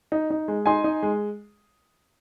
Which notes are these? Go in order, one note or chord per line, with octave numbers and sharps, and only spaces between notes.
D#4
D#4
G#3
D#4 G#5 C6
D#4
G#3